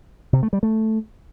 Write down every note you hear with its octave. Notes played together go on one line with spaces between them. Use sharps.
C3
A3
G3
A3